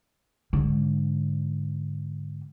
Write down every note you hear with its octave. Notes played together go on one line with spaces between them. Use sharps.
G#2 D3